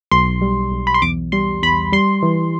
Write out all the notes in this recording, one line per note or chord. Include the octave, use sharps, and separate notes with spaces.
B1 C6
G3
B1
B5
C6
E2 D6
G3 C6
E2 B5
G3 C6
E3